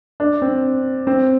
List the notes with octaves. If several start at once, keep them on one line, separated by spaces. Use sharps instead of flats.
D4
C4
C4